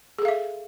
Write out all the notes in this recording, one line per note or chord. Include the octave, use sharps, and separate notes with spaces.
G#4 A4 E5 F5